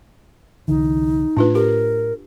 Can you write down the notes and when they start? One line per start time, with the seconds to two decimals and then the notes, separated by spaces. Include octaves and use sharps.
0.68 C2 D3 E3 D#4
1.37 A2 A3 D4 F4 B4
1.55 G4 A#4